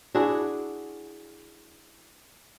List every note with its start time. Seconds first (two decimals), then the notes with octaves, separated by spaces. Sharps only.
0.15 D4 E4 F#4 G#4